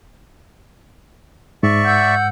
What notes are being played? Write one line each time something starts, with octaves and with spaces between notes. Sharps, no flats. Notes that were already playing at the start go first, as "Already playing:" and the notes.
G#2 D5 E5 C#6
F#5 E6 G6